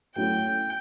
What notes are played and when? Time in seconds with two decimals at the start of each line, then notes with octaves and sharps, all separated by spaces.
0.15 F#3 A3 C#4 E4 G5